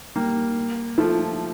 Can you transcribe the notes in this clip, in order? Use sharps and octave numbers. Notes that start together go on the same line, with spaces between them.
G3 A#3
F3 A3